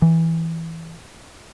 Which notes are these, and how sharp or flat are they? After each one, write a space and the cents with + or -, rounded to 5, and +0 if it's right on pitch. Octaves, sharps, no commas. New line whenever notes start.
E3 -5